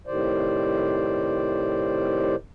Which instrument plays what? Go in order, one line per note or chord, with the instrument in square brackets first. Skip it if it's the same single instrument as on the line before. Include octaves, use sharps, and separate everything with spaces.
[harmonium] A2 C3 D#3 C5 D5